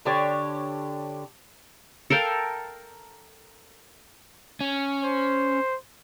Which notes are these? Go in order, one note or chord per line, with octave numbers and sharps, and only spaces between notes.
D3 D4 G4 C#5
A4 A#4 F5 G5
C#4
C5